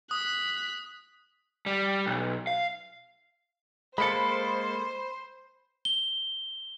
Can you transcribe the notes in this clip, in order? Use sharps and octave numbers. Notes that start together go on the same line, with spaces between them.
D#6 F#6 B6
G3
B1
F5
G#3 A#3 A4 C5 B5 C#7
G7